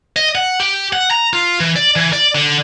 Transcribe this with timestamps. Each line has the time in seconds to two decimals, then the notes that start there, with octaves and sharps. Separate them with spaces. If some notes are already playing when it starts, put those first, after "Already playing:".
0.16 D#5
0.35 F#5
0.60 G4
0.93 F#5
1.11 A#5
1.33 F4
1.60 E3
1.76 D5
1.96 E3
2.13 D5
2.35 D3